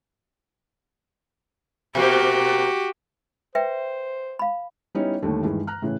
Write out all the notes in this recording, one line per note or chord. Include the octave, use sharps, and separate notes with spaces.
B2 A#3 C4 F#4 G4
B4 C5 E5 G5
F5 B5
G3 B3 C#4 D#4 E4 C#5
D#2 D3 D#3 G3 A3
G2 D#3 E3 G#3
A#5 F6 F#6
A2 C#3 E3